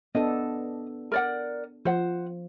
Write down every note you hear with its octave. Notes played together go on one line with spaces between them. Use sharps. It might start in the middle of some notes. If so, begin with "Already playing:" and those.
B3 D4 A4 D#5
A#4 D5 F#5
F3 C5 F#5